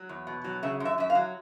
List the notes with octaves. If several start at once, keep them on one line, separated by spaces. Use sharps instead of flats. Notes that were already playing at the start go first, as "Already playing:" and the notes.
Already playing: F#3
E2
B2
F#3
C#3 E5
F#2
E5
F#2 E5
F5
F#3